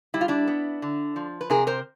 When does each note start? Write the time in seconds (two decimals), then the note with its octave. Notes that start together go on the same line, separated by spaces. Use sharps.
0.14 G3 E4
0.21 F4
0.28 D4 E4
0.47 B3
0.82 D3
1.16 F3
1.41 B4
1.50 C3 G#4 A#4
1.67 A#4 C5